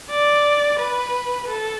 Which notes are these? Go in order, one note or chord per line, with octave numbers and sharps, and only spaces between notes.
D5
B4
A4